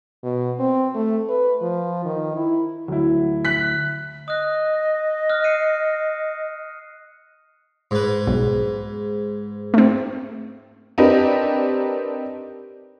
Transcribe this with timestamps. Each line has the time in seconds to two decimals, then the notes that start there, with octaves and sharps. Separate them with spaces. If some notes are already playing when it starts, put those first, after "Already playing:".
0.23 B2
0.60 C4
0.95 A3
1.29 B4
1.62 F3
2.05 D#3
2.36 E4
2.88 D2 F#3 E4
3.45 F#6 B6
4.28 D#5 D#6 F#6
5.29 D#6 F6 F#6
5.44 C7 C#7 D#7
7.91 G#2 B4
8.27 B1
9.74 A3 C4
10.98 C4 D4 D#4 G4 A#4 B4